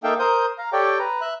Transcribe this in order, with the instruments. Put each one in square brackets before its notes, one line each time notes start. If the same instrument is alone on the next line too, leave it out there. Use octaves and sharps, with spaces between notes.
[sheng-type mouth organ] A#3 D#4 A4 E5 F5 G5
A#4 C5 D#6 G6
F5 A#5
G4 A4 C#5 D5 G5
B4 A#5
E5 F#6